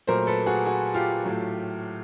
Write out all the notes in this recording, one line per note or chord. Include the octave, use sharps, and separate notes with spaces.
A#2 F#3 A3 A#4 C5
A4 B4
F#4 G#4
F#4 G#4
F4 G4
A2 F#3 A3